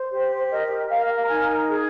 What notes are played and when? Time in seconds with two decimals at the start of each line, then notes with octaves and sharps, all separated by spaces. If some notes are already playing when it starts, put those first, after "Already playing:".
Already playing: C5
0.11 G4
0.51 A#4 D#5
0.90 A#4 F5
1.22 A#5
1.29 D#4 G#5
1.68 G#4